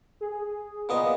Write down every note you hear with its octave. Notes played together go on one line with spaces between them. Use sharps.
G#4
A#2 B3 D#5